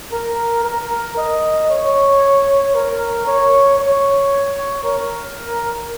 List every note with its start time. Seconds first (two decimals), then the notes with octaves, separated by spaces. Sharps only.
0.13 A#4
0.65 A#4
1.17 D#5
1.70 C#5
2.75 A#4
3.27 C#5
3.79 C#5
4.84 A#4